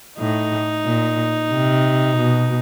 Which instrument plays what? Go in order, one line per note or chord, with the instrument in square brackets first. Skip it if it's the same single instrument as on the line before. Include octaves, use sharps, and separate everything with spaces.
[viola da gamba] A2 [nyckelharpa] D#4
[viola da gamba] A#2
C3
B2